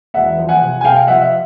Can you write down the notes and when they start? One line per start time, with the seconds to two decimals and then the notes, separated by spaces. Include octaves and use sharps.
0.14 E1 E5 F#5
0.38 F3
0.49 F#5 G#5
0.61 C3
0.81 G#5
0.84 C3 F5 G5
1.08 F3 E5 F#5
1.21 E5